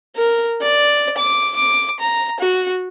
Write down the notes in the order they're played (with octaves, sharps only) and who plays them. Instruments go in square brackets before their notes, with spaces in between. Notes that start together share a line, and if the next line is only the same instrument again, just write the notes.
[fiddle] A#4
D5
D6
D6
A#5
F#4